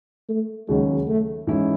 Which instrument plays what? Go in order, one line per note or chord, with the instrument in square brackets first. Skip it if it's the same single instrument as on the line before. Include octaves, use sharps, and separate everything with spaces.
[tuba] A3
[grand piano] D#2 C#3 F#3 [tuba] G#3
[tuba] A3
[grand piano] G#2 E3 G#3 C#4 E4